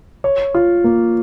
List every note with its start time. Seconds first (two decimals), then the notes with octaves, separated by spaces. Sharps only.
0.24 C#5
0.55 F4
0.84 A#3